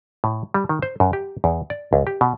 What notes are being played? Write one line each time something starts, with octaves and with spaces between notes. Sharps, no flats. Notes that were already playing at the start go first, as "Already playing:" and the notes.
A2
G3
D#3
C5
F#2
G4
E2
D5
C#2
G4
B2